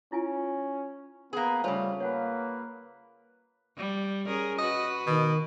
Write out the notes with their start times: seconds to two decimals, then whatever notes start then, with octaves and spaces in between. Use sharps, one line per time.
0.12 C#4 E4 F4 G#5
1.33 A#3 B3 G#4 B4
1.64 C#3 G3 A3 F4 C5 C#5 G#5
2.00 A#3 B4 C#5 F#5 G#5
3.77 G3
4.26 C#4 G#4 A#4
4.59 F#4 B4 D#5
5.07 B2 D#3